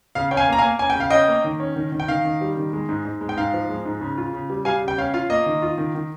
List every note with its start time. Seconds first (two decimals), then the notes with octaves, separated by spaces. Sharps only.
0.15 C#3 F5
0.31 C#4 G5
0.37 F5 G#5
0.48 A#3 A#5
0.58 F5 G#5
0.64 A#3
0.79 C#4 G#5
0.90 G5
0.95 C#3 F5
1.10 C#4 D#5 G5
1.28 A#3
1.44 D#3
1.60 C#4
1.76 D#3
1.92 D#3
2.00 G5
2.08 D#3 F5
2.25 D#3
2.41 G3
2.57 D#3
2.73 G#3
2.89 G#2
3.05 G#2
3.21 G#3
3.29 G5
3.37 G#2 F5
3.53 F3
3.69 G#3
3.85 G#2
4.01 C#3
4.18 F4
4.33 C#3
4.50 G3
4.65 G3 F5 G#5
4.82 C#3
4.88 G5
4.98 C#4 F5
5.14 F4 F5
5.30 A#3 D#5
5.46 D#3
5.62 F4
5.78 D#3
5.95 D#3